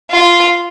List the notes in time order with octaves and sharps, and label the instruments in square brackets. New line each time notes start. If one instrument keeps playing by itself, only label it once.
[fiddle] F4